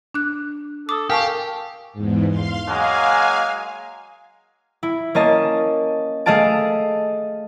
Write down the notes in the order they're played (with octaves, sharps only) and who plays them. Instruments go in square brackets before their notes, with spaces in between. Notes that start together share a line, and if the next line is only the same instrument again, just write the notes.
[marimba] D4 F#6
[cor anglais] A4 [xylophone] D6 D#6
[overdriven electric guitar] G4 [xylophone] A#4 [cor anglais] F5 [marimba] G#5 A5 C#6
[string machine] E2 G#2
F5 C6
[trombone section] F#3 G#3 A#3 [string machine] F5 G#5
[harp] E4
A#3 C#4 D#5 A5
A3 G#4 D#5 F5 A5 D7